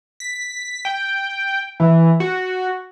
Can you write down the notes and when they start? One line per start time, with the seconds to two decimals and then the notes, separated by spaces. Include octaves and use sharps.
0.20 B6
0.85 G5
1.80 E3
2.20 F#4